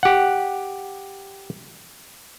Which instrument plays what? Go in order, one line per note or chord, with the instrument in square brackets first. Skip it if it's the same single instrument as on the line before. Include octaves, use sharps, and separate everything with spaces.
[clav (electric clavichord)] G4 F#5